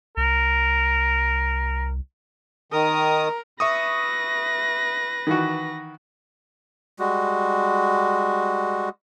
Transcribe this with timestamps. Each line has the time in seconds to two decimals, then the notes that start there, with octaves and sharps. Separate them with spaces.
0.17 C2 A#4
2.72 D#3 A#4 D#6
3.60 B4 E5 C#6 D#6 A#6
5.27 D#3 E3 F#4
6.99 G3 G#3 F#4